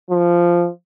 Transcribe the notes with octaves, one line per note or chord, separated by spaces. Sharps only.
F3